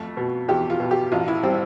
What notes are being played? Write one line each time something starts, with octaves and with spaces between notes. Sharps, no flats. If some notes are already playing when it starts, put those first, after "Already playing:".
Already playing: F2 A3
B2
E2 G4
F4
B2
G4
A1 F4
E4
G3 C4